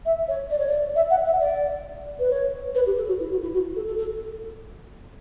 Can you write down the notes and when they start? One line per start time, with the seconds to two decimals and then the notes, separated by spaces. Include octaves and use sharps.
0.05 E5
0.28 C#5
0.50 D5
0.58 C#5
0.67 D5
0.95 E5
1.10 F#5
1.25 E5
1.40 D5
2.19 B4
2.30 C#5
2.74 B4
2.86 G4
2.97 A4
3.08 F#4
3.19 E4
3.31 F#4
3.42 E4
3.53 F#4
3.76 A4
3.87 A4
3.98 A4